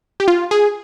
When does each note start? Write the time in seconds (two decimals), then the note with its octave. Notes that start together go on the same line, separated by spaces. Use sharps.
0.20 G4
0.28 F4
0.51 G#4